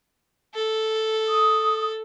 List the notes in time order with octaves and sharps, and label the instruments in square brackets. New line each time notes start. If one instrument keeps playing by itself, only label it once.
[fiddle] A4
[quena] D#6